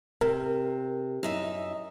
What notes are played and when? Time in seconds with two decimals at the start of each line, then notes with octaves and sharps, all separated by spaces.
0.21 C3 A#4
1.23 F#2 D#4 E5